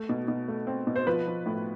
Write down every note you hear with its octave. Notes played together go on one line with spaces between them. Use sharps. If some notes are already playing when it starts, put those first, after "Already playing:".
Already playing: A3
B2
B2
A3
C4
B2
C5
F3 B4
F3
A2